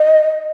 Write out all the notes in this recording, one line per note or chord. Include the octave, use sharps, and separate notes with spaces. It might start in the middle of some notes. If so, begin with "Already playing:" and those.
Already playing: D#5